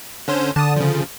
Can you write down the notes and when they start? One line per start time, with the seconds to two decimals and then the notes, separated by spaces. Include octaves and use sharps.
0.28 D3 C#4 C5
0.56 D3 A5 D#6
0.76 C#3 F3